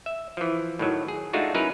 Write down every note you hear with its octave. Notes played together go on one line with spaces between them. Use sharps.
E5
E3 F3
A2 D#3 F#3
G#4
G#3 A3 D4 D#4 F4 F#4
F#3 C#4 D#4 E4 A#4 B4